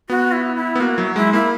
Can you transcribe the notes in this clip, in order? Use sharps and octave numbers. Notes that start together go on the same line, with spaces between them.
B3 F#4
E4
E4
B3
A#3 F#4
F#3 E4
G#3 E4
A#3 E4